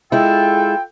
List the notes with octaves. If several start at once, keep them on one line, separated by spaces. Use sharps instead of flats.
G#3 E4 F4 A4 G5